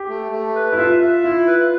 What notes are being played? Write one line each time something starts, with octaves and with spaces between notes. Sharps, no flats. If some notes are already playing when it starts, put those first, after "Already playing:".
Already playing: G4
A3
A3
B4
E4
F4 E5
E5
E4 F4
B4